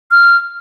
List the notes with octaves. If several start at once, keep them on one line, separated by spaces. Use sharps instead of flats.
F6